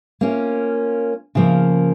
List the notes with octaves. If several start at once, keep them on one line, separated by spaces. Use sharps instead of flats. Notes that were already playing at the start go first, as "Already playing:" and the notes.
A#3 C#4 F4
C#3 F3 A#3